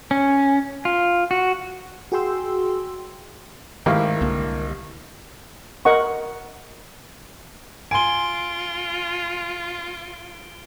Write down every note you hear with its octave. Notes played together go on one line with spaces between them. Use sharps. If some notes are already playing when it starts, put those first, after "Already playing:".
C#4
F4
F#4
F#4 G#4 G5 C6 E6
G#1 D#3 A3 E4 G4 A#4 F5
C2 D3 A#3
A#4 D#5 F#5 C#6
F4 G#5 C6 D7 G7